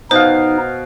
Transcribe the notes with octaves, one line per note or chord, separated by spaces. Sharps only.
B2 D#4 C5 F5